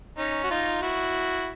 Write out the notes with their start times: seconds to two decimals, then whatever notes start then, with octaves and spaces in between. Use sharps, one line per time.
0.18 C#4 D#4
0.44 F#4
0.50 D#4 F4
0.81 E4 F#4